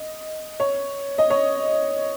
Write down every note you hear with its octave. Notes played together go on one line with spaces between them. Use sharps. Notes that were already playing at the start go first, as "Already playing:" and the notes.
Already playing: D#5
C#5
D#5
C#5